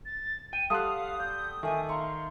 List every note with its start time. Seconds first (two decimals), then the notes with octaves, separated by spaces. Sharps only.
0.05 A6
0.53 G5 D#7
0.70 G3 A4 F5 F#5 A5 C6 D#6 F#6
1.19 D5 G6
1.63 D#3 A3 E5 G#5 D6
1.89 F5 A#5 C6 C#6